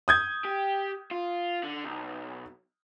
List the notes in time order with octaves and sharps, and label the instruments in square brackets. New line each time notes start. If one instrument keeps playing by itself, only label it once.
[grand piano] D#6 G6 G#6
[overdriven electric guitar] G4
F4
D3
B1